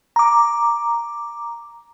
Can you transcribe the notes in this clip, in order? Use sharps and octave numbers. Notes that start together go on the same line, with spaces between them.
A#5 D6